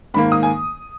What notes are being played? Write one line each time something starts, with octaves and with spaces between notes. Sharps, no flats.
G#2 D#3 A#3 B5
D#6
G#5